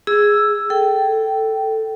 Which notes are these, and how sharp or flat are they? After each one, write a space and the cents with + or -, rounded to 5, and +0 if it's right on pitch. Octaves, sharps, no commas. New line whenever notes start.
G#4 +0 E6 +5
A4 +5 G5 -15